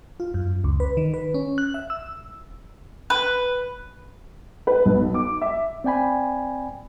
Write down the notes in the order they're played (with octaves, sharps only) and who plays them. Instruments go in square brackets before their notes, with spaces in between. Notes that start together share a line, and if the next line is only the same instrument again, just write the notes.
[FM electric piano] F4
F#2
C#2
B4
D#3
B4
C#4
F#6
E5
E6
[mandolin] B4
[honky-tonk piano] B4
B1
D6
E5
[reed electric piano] C4 D5 G5 G#5 B5